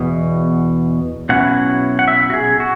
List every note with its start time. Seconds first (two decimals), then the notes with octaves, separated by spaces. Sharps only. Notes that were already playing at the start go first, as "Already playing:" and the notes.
Already playing: E2 B2
1.29 B2 F#3 C#4 E4 F#5
1.99 F#5
2.08 E5
2.30 F#4
2.33 G#4
2.60 F#4